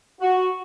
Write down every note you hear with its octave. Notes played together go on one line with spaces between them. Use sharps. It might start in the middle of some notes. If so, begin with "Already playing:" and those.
F#4